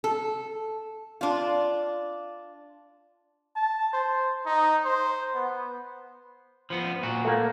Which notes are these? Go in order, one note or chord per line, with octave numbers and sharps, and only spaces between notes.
A4
D4 F4
A5
C5
D#4
C5
B3
F3 B3
A#2 F#4
A3 A#3